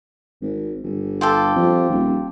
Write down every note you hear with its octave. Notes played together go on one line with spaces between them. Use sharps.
G#1
G1
F4 G4 A4
F2
D#1